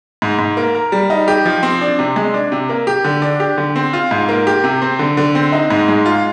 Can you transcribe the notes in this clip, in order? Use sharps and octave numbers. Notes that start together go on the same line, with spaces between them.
G#2
G#2
A#3
A#4
G3
D#4
G4
F3
C4
D4
C3
G#3
D4
C3
A#3
G4
D3
D4
G4
D3
C4
F4
G#2
A#3
G4
C3
C4
D3
D3
C4
D#4
G#2
G#3
F4